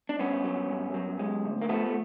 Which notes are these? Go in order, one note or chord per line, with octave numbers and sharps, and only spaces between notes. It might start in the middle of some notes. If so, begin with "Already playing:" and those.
D4
G2 B3 C#4
F#3
G2
F#3
G#3
D2
A#3
F3 A3 B3
A3